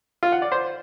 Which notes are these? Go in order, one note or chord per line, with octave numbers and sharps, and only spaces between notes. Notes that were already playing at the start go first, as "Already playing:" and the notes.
F4
F#5
D5
C5